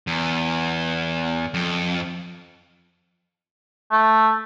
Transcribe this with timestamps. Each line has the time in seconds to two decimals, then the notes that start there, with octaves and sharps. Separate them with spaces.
0.07 E2
1.54 F2
3.91 A3